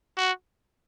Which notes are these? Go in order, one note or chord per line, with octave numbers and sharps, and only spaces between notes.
F#4